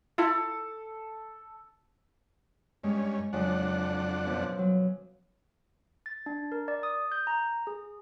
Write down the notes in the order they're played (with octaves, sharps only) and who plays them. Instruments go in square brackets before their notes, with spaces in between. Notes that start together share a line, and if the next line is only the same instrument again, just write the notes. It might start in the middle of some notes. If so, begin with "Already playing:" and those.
[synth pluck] E4 F4 [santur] A4
[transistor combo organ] G2 C#4 [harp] G#3
[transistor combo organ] F2 D4 F#5 [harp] C#3 F#3
[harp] F#2 B2 F3
F#3
[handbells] A6
D4
A#4
D5
D#6
G6
A#5
G#4